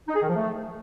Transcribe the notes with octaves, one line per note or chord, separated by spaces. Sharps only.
D#4
G#4
D#3
F3
A3